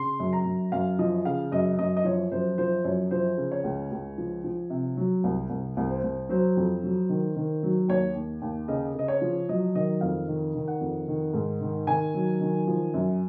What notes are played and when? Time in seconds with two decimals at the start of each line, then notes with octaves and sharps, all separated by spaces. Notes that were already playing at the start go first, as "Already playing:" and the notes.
Already playing: C#3 C6
0.20 F#2
0.33 A#5
0.45 F#2
0.72 F#2 F5
0.99 F3 D#5
1.25 C#3 F5
1.52 F#2 D#5
1.79 F#2 D#5
1.97 D#5
2.04 F3 C#5
2.32 F#2 C5
2.58 F3 C5
2.84 F#2 C#5
3.11 F3 C5
3.38 C#3
3.51 C#5
3.64 C#2
3.91 C#2
4.18 F3
4.44 F3
4.70 C3
4.97 F#3
5.24 C2
5.50 C2
5.77 C2
5.90 C5
6.03 C2
6.29 F#3 C5
6.57 F2
6.83 F#3
7.09 D#3
7.36 D#3
7.63 F#3
7.89 D#2 C#5
8.16 D#2
8.42 D#2
8.68 C#3 D#5
8.95 C#3 D#5
9.08 C#5
9.21 F3
9.49 F#3 D#5
9.75 D#3 D#5
10.01 F2 F5
10.28 D#3
10.55 D#3
10.68 F#5
10.81 F2
11.08 D#3
11.34 G#2
11.61 D#3
11.87 D#3 G#5
12.14 F#3
12.41 D#3
12.67 F3
12.94 F#2